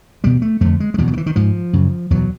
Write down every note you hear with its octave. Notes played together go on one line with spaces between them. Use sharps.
E2 B2 G3
A3
F2 D3 A3
G#3
G#3
E2 B2 G3
F#3
D#3
E3
D#3
G#2 F3
F#2 C#3
E2 B2 F#3